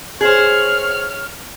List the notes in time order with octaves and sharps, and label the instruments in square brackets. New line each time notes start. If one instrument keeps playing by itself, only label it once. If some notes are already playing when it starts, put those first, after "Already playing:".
[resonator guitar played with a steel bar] G#4 C5 [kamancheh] C#5 F6